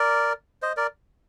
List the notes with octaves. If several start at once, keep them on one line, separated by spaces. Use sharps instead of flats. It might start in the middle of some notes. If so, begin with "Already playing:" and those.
Already playing: A#4 D5
C5 D#5
A#4 D5